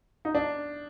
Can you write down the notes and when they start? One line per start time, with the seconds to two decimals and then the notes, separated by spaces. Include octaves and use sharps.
0.25 D#4
0.35 D4